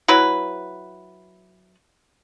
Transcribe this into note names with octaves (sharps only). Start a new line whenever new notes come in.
F#3 E4 B4